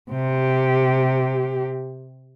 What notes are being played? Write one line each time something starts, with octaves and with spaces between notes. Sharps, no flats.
C3 G4